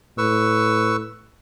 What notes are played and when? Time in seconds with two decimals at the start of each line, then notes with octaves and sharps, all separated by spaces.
0.18 A2 B4 C#6 E6